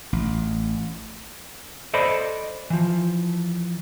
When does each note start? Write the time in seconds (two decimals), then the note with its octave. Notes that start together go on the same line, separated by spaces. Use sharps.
0.13 A1
1.94 A4 C5 D5 D#5 B5
2.70 E3 F3